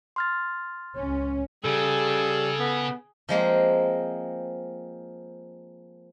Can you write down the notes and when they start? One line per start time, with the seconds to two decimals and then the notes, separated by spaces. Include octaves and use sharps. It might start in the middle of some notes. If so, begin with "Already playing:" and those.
0.16 C6 F6 A6
0.98 C#2 C#4
1.64 C#3 G3 G#4 A4
2.59 B3
3.29 F3 G#3 A#3 C4